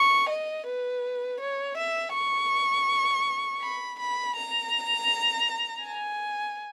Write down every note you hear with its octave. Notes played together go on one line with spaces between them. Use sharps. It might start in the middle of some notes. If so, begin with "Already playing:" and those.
Already playing: C#6
D#5
B4
C#5
E5
C#6
B5
B5
A#5
G#5